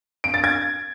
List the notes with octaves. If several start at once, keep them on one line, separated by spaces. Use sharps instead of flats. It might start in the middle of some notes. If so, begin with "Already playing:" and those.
D7
A6
G#6